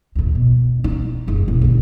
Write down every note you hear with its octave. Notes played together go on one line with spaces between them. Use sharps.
D#2 A2
B2
D#4
F#1 E2
E1
A#1 D3